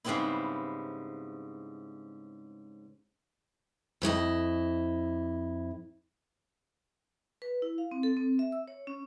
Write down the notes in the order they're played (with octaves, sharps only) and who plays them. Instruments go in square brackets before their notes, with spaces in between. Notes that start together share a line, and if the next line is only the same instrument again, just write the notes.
[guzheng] G#2 C#3 G3 B3 C4 E4
[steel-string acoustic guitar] F2 E4 G4 D#5
[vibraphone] B4
E4
F5
C4
A4
C4
E5
E6
C#5
C#4